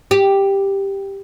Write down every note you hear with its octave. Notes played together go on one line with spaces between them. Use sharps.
G4